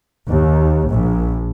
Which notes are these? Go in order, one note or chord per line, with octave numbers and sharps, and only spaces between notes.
D#2
A#1